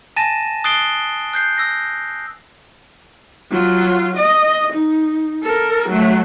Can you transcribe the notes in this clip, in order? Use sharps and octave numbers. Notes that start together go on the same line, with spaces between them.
G#5 A5 A6 A#6 D#7 E7
D#6 F#6 A6 C7 D7 G7
F#6 G6 C7
E6 A#6
F#3 F4
D#5
D#4
A4 A#4
F#3 A3